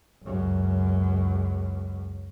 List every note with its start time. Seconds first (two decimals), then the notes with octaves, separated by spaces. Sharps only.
0.24 C#2 F#2